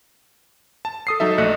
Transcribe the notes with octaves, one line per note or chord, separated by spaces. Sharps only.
A5
A4 D#6 C7
F#3 D#4 A4 E5
A#1 A3 D#5 F#6 C#7